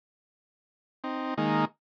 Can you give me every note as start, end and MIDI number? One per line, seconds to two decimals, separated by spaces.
1.04 1.34 60
1.04 1.34 63
1.38 1.65 51
1.38 1.65 56
1.38 1.65 58
1.38 1.65 63